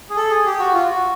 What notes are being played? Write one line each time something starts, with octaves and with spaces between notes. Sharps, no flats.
G#4
A4
G#4
G4
F#4
F4
F#4